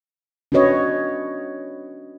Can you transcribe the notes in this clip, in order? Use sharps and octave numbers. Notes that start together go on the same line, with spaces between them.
C#4 D4 F#4 B4 C#5 D#5